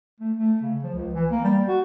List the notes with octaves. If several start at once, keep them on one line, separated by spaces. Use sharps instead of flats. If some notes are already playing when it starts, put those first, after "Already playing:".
A3
A3
C#3
F3
C#2
E3
A#3
G3
F#4